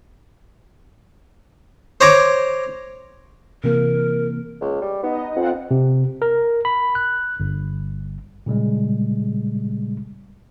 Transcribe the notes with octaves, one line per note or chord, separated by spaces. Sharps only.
C5 C#5 A#5 D6
C3 E3 A#3 A#4
C#2
G3
B3 D#4 D#5
F2 C4 F4 F#5
C3
A#4
B5
F#6
G1
A#2 C#3 G3 G#3